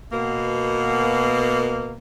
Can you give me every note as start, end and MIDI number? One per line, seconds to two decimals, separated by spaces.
0.12 1.96 47
0.12 1.96 58